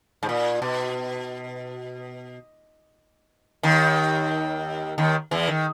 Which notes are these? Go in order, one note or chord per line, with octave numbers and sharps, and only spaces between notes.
G#2
A#2
B2
D#2 D#3
D#2 D#3
E2 E3
D#3